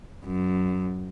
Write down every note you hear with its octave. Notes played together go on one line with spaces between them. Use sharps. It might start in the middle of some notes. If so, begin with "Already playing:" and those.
F#2